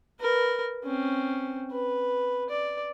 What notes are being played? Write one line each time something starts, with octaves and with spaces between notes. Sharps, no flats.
A#4 B4
C4 C#4
B4
D5